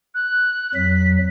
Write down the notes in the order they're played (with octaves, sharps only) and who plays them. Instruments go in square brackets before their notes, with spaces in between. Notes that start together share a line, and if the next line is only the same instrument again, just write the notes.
[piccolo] F#6
[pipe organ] F2 F#3 [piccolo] B6